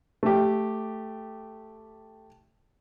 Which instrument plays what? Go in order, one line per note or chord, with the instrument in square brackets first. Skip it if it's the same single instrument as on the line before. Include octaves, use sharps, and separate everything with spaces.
[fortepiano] A3 G4